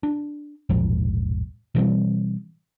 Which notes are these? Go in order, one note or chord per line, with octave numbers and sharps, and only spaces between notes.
D4
E1 A#1 G#2 F3
B2 E3 G3 C4